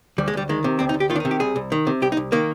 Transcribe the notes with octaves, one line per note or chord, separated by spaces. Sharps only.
D2 G3
G#3
D2 G3
D#3 G#3
C3
D2 C4
D#4
D2
G4
D#3 F4
D4
D#4
C3
G4
C2 G#4
C2
D#3
C3
C2 G4
D#4
C2
D#3 A#3